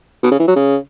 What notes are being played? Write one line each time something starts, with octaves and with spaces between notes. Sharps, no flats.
B2
C#3
E3
F#3
C#3